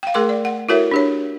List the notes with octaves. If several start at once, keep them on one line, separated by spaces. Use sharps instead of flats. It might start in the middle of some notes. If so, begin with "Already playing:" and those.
F5 G5
A3 G#4 A#4 C6 D6
D5
F#5
E4 F#4 A4 A#4 C#5 E5
D4 G4 C#5